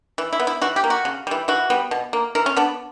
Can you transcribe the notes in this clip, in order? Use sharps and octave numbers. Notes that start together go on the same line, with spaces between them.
E3
E4
B3
E4
E3 F#4
G4
A#3
F#4
C#3
E3 G3
E3 F#4
G3 B3
B2
A#3
E3 A#4
C#4
B3 D4